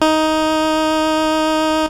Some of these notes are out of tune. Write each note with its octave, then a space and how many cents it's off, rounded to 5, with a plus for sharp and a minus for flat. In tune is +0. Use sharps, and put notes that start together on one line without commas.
D#4 +10